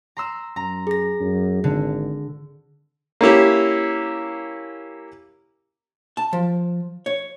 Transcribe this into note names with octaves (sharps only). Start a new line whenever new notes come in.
A#5 C6 E6
F#2 A#5
G#4 A#6
F#2
G#1 D3
A#3 C#4 E4 G4
A5
F3
C#5